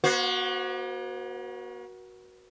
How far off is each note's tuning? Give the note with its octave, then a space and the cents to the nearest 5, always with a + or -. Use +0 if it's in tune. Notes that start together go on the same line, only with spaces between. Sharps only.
A#3 +45 F#4 +0 C5 +0